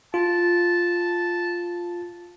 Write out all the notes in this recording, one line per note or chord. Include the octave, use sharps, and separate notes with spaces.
F4 A5